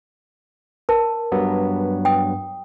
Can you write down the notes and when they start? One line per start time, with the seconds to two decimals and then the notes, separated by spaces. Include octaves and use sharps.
0.89 A#4 A5
1.32 G2 F#3 B3
2.05 G5 D#6